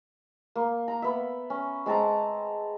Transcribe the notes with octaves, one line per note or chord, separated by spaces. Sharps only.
A#3
A#5
B3 E5
C#4
G#3 C4 A5 A#5